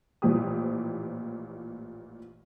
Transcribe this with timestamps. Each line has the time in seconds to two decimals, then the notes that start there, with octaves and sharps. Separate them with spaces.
0.22 A1 A#2 E3 F3 G4 D#6